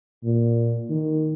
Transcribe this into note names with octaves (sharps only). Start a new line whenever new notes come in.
A#2
D#3